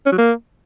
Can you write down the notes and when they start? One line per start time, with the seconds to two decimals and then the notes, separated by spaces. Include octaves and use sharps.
0.06 C#4
0.12 F#3
0.18 A#3